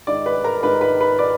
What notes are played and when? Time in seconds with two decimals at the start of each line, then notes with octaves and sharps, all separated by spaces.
0.07 G#2 D#3 D5 D6
0.26 B4 B5
0.44 A#4 A#5
0.63 G#2 D#3 B4 B5
0.81 B4 B5
1.01 B4 B5
1.19 D#3 D5 D6